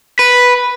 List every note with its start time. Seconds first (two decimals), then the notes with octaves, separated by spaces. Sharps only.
0.19 B4